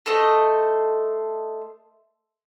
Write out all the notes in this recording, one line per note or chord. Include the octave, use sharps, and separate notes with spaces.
A3 A4 C5 D#5